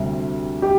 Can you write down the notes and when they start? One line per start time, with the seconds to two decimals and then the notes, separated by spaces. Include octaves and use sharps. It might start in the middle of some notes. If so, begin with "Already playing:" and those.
Already playing: D2 C3 G3
0.62 G4